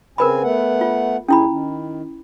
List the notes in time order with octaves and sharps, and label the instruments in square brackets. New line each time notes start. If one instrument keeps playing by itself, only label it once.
[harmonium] C#3 C4 G#5 [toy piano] A#4 B4 B5
[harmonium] A3 B3 F#5
[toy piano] F4
[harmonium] D#2 D#3 G#4 [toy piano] C#4 E4 B5
[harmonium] D#3